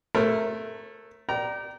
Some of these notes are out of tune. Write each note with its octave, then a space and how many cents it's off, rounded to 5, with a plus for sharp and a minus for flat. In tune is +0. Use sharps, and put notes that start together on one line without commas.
A3 +0 A#4 +0 C#5 -45
D5 +15 G5 -35 A#5 +5